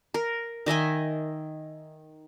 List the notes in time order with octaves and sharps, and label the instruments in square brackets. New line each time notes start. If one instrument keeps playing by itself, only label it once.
[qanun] A#4
D#3 D#5 E5 G#5